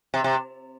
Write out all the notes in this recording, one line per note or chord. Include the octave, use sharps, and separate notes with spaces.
C3
C3